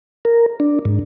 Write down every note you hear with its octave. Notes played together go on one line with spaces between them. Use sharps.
A#4
D4
G#2